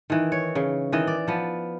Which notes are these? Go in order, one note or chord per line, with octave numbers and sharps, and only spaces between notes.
D#3 E3
C#5
C#3
D#3 E3 D#5
D5
F3 B3